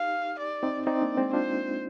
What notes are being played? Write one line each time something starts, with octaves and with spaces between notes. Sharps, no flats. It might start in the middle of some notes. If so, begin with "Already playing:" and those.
Already playing: D#4 G4 F5
D5
C4 D#4
C4 D#4 D5
A#3 D4
G#3 C4
D4 F4 C5